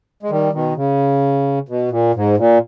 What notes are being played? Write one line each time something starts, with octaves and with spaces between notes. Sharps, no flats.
G#3
D#3 G3
B2 D#3
C#3
B2
A#2
G#2
A#2